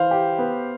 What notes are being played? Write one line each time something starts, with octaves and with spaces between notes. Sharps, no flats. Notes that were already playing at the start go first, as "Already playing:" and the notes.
Already playing: E3 C5 F5
G4
B3